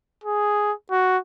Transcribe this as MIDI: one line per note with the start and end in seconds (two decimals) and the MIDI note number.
0.24 0.72 68
0.91 1.18 66